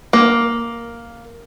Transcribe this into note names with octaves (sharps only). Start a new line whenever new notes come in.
A#3